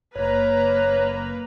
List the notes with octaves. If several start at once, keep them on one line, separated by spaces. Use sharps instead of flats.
F#1 A#3 B4 C#5 A#5